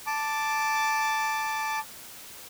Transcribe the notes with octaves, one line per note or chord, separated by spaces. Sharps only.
A5 D6